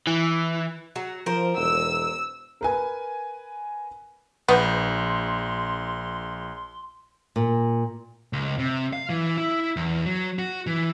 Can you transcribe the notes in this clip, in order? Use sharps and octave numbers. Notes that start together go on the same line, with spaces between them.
E3
F#3 F#4
F3 A#4 C5
E1 E6
A#4 B4 G#5
A#1 B3 C6 G6
A#2
C#2
C3
F5
E3
E4
E2
F#3
F#4
E3